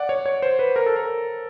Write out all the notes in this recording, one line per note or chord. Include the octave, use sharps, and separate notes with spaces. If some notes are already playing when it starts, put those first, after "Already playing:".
Already playing: D5 F#5
C#5
C#5
C5
B4
A#4
A4
A#4